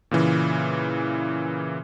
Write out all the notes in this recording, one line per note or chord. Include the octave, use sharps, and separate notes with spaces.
A#2 C#3 E3